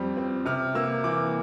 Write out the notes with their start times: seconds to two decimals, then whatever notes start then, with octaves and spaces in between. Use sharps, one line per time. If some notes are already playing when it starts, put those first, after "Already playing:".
Already playing: F2 G3 C4
0.17 C4
0.46 C3 F6
0.75 A#3 E6
1.04 E3 D6